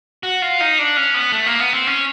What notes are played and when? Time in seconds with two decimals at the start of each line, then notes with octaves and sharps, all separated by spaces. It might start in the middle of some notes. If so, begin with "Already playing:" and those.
0.23 F#4
0.42 F4
0.60 D#4
0.79 D4
0.97 C#4
1.14 B3
1.32 A3
1.46 A#3
1.60 B3
1.73 C4
1.87 C#4